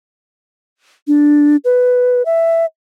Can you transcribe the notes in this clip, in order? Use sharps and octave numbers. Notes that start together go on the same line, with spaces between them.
D4
B4
E5